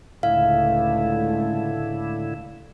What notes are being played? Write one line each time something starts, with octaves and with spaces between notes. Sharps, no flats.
C#2 A2 D3 A3 E4 F5